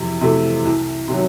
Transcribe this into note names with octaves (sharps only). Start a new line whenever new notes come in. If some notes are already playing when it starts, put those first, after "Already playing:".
Already playing: F2 C3 E3
C3 E3 A3
C2
C3 D#3 F#3